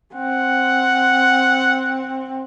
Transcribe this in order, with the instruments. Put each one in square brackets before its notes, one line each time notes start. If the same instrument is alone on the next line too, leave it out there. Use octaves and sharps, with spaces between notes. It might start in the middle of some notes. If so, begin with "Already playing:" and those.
[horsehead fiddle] C4 [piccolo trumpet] F#5